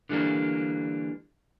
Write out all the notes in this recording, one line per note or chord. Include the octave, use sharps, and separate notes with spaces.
D3 E3 G3 A#3 D4